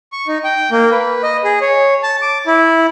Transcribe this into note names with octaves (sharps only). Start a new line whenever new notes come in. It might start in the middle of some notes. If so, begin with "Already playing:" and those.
C#6
D#4
G5
A#3
B4
D#5
G#4
C#5
A5
D6
E4